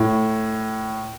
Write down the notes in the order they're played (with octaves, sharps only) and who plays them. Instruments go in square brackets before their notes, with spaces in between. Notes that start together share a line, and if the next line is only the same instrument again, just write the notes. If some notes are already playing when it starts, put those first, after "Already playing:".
Already playing: [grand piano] A2